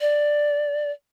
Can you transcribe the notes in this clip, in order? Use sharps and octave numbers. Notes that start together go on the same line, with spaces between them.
D5